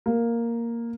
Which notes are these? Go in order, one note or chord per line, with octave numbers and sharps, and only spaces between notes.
A#3